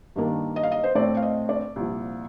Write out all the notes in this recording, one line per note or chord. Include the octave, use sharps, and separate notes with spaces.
G2 D#3 A#3 D4
D#5
F5
D#5
C5
A2 A3 C4 D5
F5
D#5
D5
C2 A#2 F3